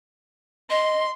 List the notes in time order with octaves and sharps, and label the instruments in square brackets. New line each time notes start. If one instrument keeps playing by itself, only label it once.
[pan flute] D#5 [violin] C6